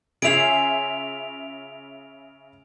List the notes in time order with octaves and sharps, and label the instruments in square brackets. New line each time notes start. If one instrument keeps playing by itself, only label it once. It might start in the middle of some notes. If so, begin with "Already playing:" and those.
[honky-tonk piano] C#3 E5 C7 [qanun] C#4 F4 G#4 [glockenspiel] D7 F7